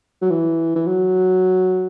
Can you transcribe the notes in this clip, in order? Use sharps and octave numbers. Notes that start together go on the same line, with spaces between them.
F#3
E3
E3
F#3